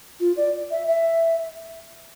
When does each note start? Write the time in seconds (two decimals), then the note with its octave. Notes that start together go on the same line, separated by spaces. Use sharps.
0.20 F4
0.37 D5
0.71 E5
0.88 E5